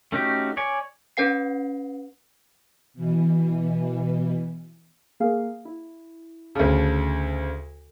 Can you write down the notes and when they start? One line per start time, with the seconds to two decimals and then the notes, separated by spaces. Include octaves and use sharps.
0.12 A3 C#4 D#4 F#4 G4
0.57 C#5 D5 G#5
1.17 C#4 B4 F#5 C7
2.94 B2 E3
5.20 A#3 G#4 F5
5.65 E4
6.55 D2 C#3 A5